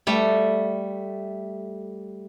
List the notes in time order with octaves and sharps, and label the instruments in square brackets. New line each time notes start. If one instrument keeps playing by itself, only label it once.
[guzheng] G3 A3